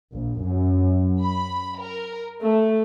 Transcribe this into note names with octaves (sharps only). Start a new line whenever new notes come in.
A#1
F#2
B5
A#4
A3